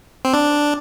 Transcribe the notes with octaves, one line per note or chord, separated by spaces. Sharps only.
C4
D4